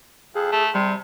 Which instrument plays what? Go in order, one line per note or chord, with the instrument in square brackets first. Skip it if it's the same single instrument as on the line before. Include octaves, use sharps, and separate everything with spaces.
[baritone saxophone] F2 [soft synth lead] G#4
[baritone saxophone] A3
[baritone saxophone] C3 [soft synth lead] G3